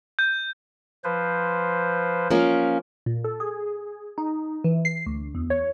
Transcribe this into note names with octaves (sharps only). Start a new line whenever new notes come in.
G6
F3 B4 C5
F3 A#3 C#4
A#2
A4
G#4
D#4
E3
C7
D2
E2
C#5